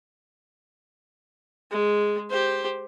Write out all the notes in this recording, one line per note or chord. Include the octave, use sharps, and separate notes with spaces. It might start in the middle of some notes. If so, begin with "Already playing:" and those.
G#3
G4 C5